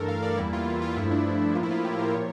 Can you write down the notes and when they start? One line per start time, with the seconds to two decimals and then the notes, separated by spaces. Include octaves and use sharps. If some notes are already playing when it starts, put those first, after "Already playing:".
Already playing: G2 E3 A3 A4 A#4
0.08 F5
0.23 D5
0.37 E2 E3 G3 A#3 E4
0.53 F4
0.68 E4
0.82 F4
0.96 G2 F3 A3 E4
1.11 D4
1.55 A2 F3 A#3 F4
1.63 E4
1.71 F4
1.84 G4
1.99 A#4
2.14 A#2 F3 A#3 C#5